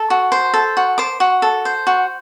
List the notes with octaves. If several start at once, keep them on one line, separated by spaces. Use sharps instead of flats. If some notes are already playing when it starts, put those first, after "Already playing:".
Already playing: A4
F#4
C5
A4
F#4
C5 D6
F#4
A4
C5
F#4